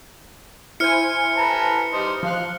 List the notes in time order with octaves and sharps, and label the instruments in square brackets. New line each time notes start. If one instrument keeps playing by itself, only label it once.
[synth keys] E4 C5 G#5 [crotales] F6 C#7
[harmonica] B4 A5 A#5
G3 D#4 C5
[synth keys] F3 F4 F#6 [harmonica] F5